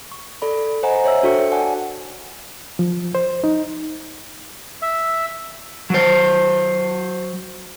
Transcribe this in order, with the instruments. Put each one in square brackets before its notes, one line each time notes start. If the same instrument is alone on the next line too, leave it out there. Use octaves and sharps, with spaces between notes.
[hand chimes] C#6
A4 D5 B5
C5 D#5 F#5 G#5 A#5
C5 C#5 E5 E6
D4 F#4 A4 G5 C#6 C#7
D5 F#5 G#5 A5
[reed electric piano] F3
C5
D#4
[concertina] E5
[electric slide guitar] F#3 C5